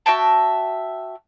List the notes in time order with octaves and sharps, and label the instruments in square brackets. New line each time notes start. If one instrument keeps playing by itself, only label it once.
[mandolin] F#4 E5 G5 A5